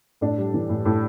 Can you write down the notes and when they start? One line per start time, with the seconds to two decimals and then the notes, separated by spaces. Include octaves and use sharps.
0.21 A2 D4
0.38 G3
0.54 E3
0.69 A2
0.85 A2